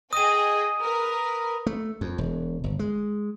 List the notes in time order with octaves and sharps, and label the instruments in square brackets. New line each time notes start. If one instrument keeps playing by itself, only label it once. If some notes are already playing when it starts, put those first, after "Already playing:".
[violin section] G#4 D#5 G5 [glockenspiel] D#6 D#7
[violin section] A#4 B4
[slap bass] A3
F2
E1
G1
G#3